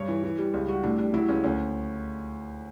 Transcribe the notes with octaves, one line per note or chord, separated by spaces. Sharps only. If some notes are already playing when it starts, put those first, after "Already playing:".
Already playing: G2 C#5
E3
E3
G3
C#2
G3 F#4
A2 D4
G3 D4
F#3 E4
C#2 C#4
D2 C#4